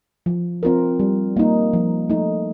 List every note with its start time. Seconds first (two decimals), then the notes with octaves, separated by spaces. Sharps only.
0.26 F3
0.63 C4 F4 A#4
0.99 G3
1.37 A#3 D#4
1.73 F3
2.10 A3 D#4